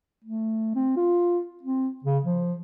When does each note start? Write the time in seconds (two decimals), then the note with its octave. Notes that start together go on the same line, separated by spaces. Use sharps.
0.25 A3
0.75 C4
0.96 F4
1.63 C4
2.04 C#3
2.24 F3